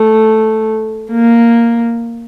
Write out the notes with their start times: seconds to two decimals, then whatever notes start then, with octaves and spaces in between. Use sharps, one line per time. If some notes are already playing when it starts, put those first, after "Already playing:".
Already playing: A3
1.10 A#3